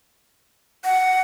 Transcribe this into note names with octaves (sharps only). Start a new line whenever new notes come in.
F#5